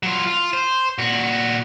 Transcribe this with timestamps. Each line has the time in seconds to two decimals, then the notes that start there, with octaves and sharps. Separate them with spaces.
0.03 F#3 F4
0.27 F4
0.53 C5
0.98 A#2 F#4